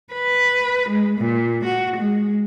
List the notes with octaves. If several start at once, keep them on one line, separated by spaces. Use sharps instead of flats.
B4
G#3
A#2
F#4
G#3